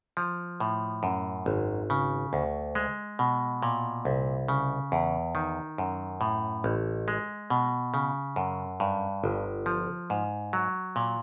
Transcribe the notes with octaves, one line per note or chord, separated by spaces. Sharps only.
F3
A2
F#2
G#1
C#3
D2
G#3
B2
A#2
C2
C#3
E2
D#3
F#2
A2
A1
G#3
B2
C#3
F#2
G2
G1
F3
G#2
F#3
A#2